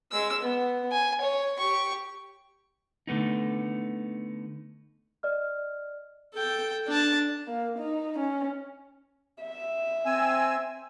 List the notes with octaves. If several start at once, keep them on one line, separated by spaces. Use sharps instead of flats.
G#3 E6
B3
G#5
C#5
G4 C#6
D3 A3 B3 D#4
D5 D#5 F6
A4 G5
D4 A5
A#3
D#4
C#4
E5
C4 G#5 E6